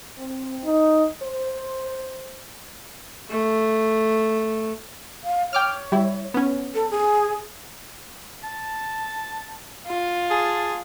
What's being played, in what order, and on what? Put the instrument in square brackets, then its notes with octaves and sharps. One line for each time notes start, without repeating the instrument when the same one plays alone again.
[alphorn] C4
D#4
C5
[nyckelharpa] A3
[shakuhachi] F5
[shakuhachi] C#5 [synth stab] G5 D6 F6
[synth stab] G3 E4
B3 C#4
[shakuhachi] A4
G#4
[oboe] A5
[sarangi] F4
[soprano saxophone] G#4 [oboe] A5